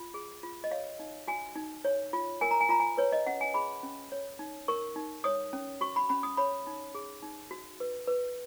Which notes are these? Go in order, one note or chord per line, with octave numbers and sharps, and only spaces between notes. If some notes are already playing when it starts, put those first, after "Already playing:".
Already playing: F4
G#4
F4
D#5
C#5 F5
D#4
F#4 G#5
D#4
C#5
F4
A#4 G#5
A#5
G#5
F4 A#5
G#5
B4 C#5
D#5
C#4 F#5
G#5
G#4 B5
C#4
C#5
D#4
A#4 C#6
D#4
C#5 D#6
C#4
F#4 C#6
B5
C#4 B5
D#6
C#5 B5
D#4
G#4
D#4
F#4
B4
B4